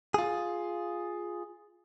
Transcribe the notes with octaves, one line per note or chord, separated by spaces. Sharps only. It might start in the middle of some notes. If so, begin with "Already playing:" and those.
F4 G#4